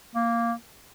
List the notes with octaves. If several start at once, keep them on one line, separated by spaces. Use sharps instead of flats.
A#3